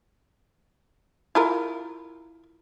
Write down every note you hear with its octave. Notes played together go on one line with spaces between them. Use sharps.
E4 F4 A#4